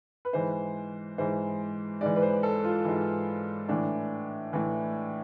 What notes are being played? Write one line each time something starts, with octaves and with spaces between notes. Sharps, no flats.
B4
G#2 E3 C5
G#2 E3 C5
G#2 E3 D5
B4
C5
A4
F4
G#2 E3
A2 E3 D4
A2 E3